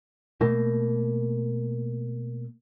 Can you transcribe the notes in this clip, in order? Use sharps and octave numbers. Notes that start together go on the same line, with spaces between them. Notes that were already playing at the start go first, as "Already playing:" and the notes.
B2 A3 A#3